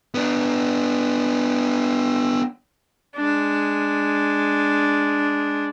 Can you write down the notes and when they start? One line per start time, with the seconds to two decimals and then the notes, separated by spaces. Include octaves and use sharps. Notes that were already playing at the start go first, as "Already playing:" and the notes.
0.15 B3 D4
3.17 G#3 D4